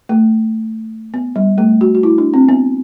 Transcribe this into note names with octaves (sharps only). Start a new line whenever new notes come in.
A3
B3
G3
A3
F#4
F#4
E4
D4
C4
B3